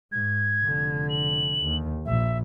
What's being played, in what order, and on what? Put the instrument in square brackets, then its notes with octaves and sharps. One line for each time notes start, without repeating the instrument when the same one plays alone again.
[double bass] G#2 [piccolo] G#6
[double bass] F1 D3
[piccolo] F#7
[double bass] D#2
[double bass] A#1 [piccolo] E5